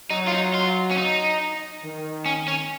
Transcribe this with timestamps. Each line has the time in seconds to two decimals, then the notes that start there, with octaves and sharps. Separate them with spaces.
0.11 F#3 D#4
0.27 F4
0.33 D#4
0.54 F4
0.91 C#4
0.97 D#4
1.83 D#3
2.26 C#4
2.48 C#4